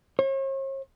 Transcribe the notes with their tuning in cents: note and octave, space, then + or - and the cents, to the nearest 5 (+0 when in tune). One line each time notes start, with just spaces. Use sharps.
C#5 -45